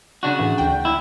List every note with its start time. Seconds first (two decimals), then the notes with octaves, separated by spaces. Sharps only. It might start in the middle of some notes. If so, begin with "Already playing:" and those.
0.23 C#3 D4 F#4
0.39 A2 E3
0.58 D2 G5
0.85 E4